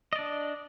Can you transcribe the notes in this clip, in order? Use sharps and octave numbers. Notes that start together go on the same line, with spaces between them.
D4 D5 D#5